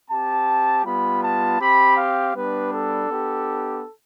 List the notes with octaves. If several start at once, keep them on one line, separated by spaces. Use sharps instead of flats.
C4 G4 A5
G3 B3 F4 B5
A5
C4 G4 B5
F5
G3 B3 D4 B4
A4
B3 D4 G4